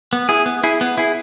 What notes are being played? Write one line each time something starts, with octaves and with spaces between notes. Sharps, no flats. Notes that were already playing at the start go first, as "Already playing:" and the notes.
B3
E4 G#4
B3
E4 G#4
B3
E4 G#4